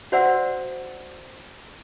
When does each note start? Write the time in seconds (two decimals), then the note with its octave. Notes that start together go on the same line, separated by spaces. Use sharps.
0.12 F#4 C5 D5 E5 F#5 E6